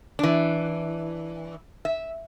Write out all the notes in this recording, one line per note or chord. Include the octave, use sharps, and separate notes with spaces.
E3 D4
E5